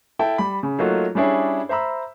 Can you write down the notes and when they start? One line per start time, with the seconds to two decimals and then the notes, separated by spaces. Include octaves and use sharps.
0.19 E4 A4 G5 A5
0.38 G3 B5
0.63 C#3
0.79 F#3 A3 A#3 D#4 F4 F#4
1.15 G3 C#4 D4 E4 G#4 C#5
1.69 C5 E5 A#5 B5 E6